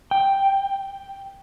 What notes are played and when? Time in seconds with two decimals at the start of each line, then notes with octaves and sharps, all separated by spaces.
0.11 G5